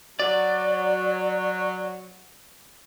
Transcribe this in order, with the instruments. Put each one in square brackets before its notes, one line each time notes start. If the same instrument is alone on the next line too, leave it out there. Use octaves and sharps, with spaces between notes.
[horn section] F#3 [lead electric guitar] D5